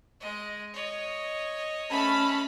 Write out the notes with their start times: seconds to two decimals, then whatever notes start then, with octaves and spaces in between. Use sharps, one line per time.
0.20 G#3 D#5
0.74 C#5 D#5
1.90 A3 C#4 A5 B5